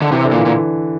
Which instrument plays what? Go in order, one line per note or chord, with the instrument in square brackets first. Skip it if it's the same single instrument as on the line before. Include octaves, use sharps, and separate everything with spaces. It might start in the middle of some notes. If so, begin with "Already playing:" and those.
[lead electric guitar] D3
[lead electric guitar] C3 [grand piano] E3
[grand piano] D3
[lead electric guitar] A#2
[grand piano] E3
[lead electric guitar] A#2